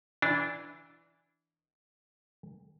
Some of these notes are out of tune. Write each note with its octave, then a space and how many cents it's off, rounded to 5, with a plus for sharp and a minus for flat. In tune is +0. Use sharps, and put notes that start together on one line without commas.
E3 +0 D4 -15